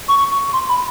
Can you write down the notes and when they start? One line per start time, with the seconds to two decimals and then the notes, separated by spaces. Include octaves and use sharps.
0.09 C#6
0.53 C6
0.69 B5